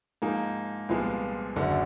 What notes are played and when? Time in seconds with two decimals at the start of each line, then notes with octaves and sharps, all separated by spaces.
0.22 G#2 F3 A#3 D#4 G#4
0.89 C2 A#2 F3 G#3 B3
1.56 F#1 F#2 D3